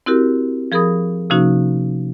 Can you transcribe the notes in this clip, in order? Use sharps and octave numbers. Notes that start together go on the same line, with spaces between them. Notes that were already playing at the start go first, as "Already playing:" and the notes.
C4 E4 F#4 G4 A#4
F3 G#4 A#4 B5 D#6
C3 F3 A#3 C#4 D#4 F#4